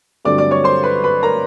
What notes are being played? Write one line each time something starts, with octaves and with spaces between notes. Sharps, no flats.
G2 D3 F#3 A3 C4 D5 D6
D5 D6
C#5 C#6
C5 C6
B4 B5
B4 B5
A#4 A#5